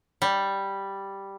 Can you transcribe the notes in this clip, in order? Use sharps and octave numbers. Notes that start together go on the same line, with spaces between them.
G3